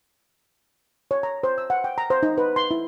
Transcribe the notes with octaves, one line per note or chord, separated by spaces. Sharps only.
C#5
A#5
C5
E6
F#5
G5
A#5
C5
D#4
B4
C6
E4